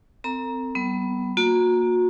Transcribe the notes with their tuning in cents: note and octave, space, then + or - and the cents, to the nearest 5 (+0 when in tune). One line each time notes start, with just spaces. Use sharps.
C4 -25 A4 +45 A#5 +15
G3 -40 B3 +0
A#3 +0 F#4 -35